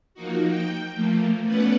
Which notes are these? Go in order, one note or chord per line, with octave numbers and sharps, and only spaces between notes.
F3 A#3 D#4 F#4
G5
F3 A3 A#3
A3 B3 C#4 B4 D5 F#5